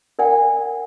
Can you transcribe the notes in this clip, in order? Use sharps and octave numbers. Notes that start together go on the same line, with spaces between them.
A#4 D5 F#5 G#5